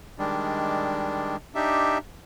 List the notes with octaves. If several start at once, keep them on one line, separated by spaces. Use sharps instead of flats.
D#3 G3 G#3 D4
D4 D#4 G4 E5